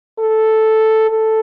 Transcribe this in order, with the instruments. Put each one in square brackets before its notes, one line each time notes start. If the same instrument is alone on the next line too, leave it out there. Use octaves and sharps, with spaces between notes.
[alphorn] A4
A4